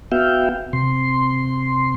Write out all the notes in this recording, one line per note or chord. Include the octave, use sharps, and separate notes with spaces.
B3 F#4 E5 F5 G5
C3 C6